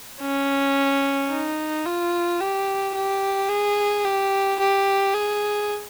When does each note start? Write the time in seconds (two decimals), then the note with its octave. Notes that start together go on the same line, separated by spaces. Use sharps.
0.21 C#4
1.30 D#4
1.86 F4
2.41 G4
2.95 G4
3.49 G#4
4.05 G4
4.60 G4
5.14 G#4